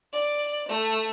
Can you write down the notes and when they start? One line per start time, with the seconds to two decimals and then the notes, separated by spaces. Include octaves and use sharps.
0.12 D5
0.68 A3